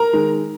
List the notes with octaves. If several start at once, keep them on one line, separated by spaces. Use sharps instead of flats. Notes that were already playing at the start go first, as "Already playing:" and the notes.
Already playing: A#4 A#5
D#3 G#3